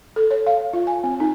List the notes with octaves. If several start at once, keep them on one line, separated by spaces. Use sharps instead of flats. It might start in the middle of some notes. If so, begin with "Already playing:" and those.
A4
C#5
F5
F4
G#5
C4
D#4